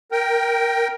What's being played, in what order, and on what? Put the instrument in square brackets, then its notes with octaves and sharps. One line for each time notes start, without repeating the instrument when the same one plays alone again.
[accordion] A#4 G5